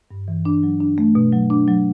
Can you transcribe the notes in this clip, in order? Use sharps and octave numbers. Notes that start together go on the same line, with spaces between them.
G2
E3
D4
F#3
D4
A3
B2
F#3
D4
F#3